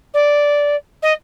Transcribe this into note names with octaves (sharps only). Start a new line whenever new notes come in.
D5
D#5